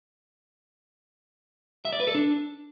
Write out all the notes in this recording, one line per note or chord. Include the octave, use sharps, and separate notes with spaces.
E5
D5
B4
A4
D4